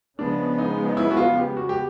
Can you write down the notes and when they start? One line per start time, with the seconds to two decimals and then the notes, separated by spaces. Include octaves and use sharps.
0.19 C#3 F3 G#3 B3 D4
0.58 D#4
0.89 D#4
0.97 E4
1.11 F#4
1.17 F4
1.37 G4
1.57 F#4
1.69 G4